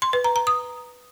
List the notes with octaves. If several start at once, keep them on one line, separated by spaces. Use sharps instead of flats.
C6
B4
A#5
A#5
D#6